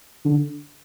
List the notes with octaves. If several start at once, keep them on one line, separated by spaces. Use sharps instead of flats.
D3